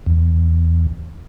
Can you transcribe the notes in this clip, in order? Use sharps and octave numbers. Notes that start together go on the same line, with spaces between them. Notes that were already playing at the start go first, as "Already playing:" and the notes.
E2